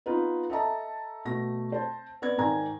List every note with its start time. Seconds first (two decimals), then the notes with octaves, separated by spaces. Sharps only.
0.06 B3 D#4 F4 B4
0.50 A4 D#5 E5 A5 A#5
1.25 B2 A3 A#6
1.72 C5 A5
2.22 B3 D5 G#6
2.38 G#2 D#3 D5 G#5 A#5 G#6